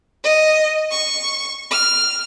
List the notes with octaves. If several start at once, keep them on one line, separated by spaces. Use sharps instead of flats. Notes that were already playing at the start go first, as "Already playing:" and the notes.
D#5
C#6
F6